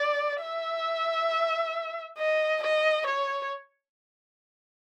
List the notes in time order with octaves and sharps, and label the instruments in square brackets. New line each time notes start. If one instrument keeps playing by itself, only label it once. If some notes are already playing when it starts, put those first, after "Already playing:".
Already playing: [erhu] D5
E5
D#5
D#5
C#5